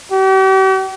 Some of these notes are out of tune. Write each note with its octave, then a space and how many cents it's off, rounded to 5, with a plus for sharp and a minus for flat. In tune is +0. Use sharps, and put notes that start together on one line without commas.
G4 -45